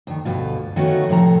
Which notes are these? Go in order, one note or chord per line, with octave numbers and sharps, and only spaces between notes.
D2 D#3
D2 G2 B2 F4
D3 D#3 A3 B3 C#4 F#4
A2 C3 F3 A4 A5 A#5